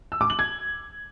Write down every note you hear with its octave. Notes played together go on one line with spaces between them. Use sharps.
E6
D6
F#7
G#6